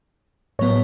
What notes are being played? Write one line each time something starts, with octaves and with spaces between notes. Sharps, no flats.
A2 F#3 B3 C#5